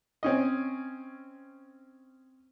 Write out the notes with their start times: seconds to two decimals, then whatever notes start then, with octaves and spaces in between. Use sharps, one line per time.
0.23 C4 C#4 D#5